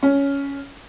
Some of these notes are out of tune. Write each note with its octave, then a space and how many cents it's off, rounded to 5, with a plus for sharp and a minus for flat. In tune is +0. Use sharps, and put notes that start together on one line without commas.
C#4 +10